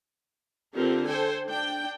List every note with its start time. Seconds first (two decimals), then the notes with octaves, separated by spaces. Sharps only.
0.73 D3 C4 F4 G4 A#4
1.07 A4 C5 G5 G#5
1.46 D4 G5